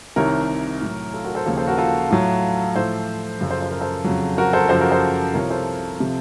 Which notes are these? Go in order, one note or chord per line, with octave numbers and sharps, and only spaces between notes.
C2 C3 D#3 A#4 C#5
A2 F#3
F4 A4
F#4 A#4
A4 C5
D#2 C#3 F3 A#4 C#5
A4 C5
F#4 A#4
F4 A4
A2 F#3
A2 F3 A4 C5
F#2 C#3 F3
A4 C5
C5
A#4
A4 C5
F2 C#3 F#3
F#4 A#4
A4 C5
A#4
F#2 C#3 F3 A4 C5
F#4 A#4
A4 C5
C2 C3 F3 A#4 C#5
A4 C5
C3 F3